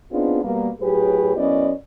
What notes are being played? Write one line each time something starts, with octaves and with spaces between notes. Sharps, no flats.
B3 C4 D4 D#4 F4 G#4
B2 G3 A#3
A2 F#3 G4 G#4 B4
F#2 B3 C#4 E4 D5 D#5